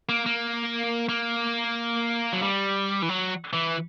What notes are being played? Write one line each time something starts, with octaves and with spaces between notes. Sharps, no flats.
A#3
A#3
A#3
F#3
G3
E3
F#3
E3